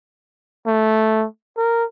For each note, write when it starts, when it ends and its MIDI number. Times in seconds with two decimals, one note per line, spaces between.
0.67 1.25 57
1.58 1.84 70